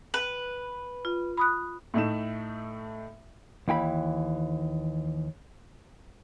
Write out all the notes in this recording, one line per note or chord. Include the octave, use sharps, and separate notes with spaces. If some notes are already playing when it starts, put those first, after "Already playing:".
B4
F4
B5 D#6 F#6
A2 A3 D#4 E7
D#2 E3 G5 B5